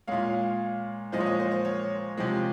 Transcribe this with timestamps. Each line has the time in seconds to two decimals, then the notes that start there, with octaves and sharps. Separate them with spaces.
0.08 A#2 G#3 C#5 F5
1.12 A#2 F3 G#3 C5 D#5
1.20 C#5
1.26 C5 D#5
1.40 C5
1.51 C5
1.65 C#5
2.17 C3 F3 G#3